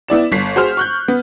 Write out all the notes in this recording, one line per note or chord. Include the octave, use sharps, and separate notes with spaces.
B3 E4 D5 E7
G1 B6 C7
F#4 G#4 C5 C6 F6
C#6 F#6 G6
B3